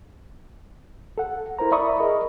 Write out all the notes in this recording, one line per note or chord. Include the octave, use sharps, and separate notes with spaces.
A4 F#5
E4 A#4 C5 A#5
D5 E5 B5 C#6 D#6
G#4 A#4 D#5